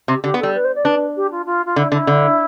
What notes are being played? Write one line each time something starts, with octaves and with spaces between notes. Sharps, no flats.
C3 G4
D3 G4
B3
G3 A4
B4
C5
D5
D4 B4
G4
F4
F4
F4
D3 E4
D3 E4
D3